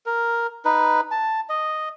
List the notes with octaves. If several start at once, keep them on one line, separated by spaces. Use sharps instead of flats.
A#4
D#4 B4
A5
D#5